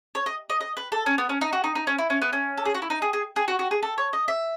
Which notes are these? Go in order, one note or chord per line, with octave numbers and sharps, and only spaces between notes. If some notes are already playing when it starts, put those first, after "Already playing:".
C#5
D#5
D#5
D#5
B4
A4
C#4
B3
C#4
D#4
F#4
D#4
D#4
C#4
E4
C#4
B3
C#4
A4
G#4
F#4
E4
D#4
G#4
G#4
G#4
F#4
F#4
G#4
A4
C#5
D#5
E5